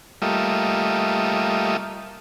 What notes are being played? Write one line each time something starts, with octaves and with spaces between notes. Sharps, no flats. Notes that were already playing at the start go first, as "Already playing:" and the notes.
G3 A3 A#3 F4 D#5 E5